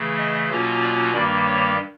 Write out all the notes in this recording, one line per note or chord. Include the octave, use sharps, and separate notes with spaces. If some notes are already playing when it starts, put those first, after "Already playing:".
Already playing: C#3 E3 A3
D#5
B2 F#3 A#3 C#4 F4
D5
G2 D#3 G3 A#3 D5
C#5